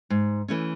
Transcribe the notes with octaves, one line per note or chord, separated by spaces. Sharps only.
G#2
E3 A3 C#4